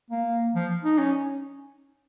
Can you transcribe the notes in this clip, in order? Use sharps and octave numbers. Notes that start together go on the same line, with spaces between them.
A#3
F3
D#4
C#4